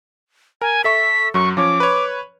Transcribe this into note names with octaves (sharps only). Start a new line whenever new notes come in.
A#4 G#5
A4 E5 C#6 B6
F#2 F#3 C#6
F3 C#4 C#5 D6
B4 C#5